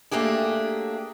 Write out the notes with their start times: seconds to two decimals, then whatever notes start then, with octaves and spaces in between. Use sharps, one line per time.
0.11 A3 A#3 D4 G4 G#4